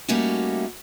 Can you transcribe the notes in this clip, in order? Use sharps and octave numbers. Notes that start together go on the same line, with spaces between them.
G3 A3 A#3 C#4 D#4 F#4